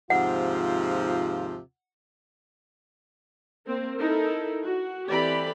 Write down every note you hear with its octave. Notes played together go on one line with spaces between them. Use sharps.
D#2 G#2 C3 F3 F4 F#5
A#3 C4
D#4 E4 A4 A#4
F#4
E3 C4 G4 A4 D5 B5